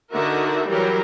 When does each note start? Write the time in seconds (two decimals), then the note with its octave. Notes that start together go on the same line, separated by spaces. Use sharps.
0.12 D3 D#4 F#4 A#4 E5
0.69 E3 F#3 G3 G4 A#4